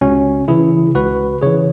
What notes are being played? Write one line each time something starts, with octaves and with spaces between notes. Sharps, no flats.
C#2 C#4 F#4
C#3 E3 E4 G#4
C#2 F#4 B4
C#3 E3 G#4 C#5